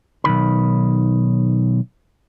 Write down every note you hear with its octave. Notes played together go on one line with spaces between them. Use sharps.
B1 F#2 D#3 B5